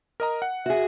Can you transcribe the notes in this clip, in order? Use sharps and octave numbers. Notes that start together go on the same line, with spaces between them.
A#4 D#5 A#5
F#5
F#4 G#4 E5